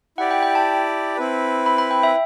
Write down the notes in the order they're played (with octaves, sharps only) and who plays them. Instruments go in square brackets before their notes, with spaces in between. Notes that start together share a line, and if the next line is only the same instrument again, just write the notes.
[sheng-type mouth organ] E4 G4 D5 [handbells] F#5
[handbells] G5
G5
A5
[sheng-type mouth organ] C4 E4 B4
[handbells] B5
B5
G5
E5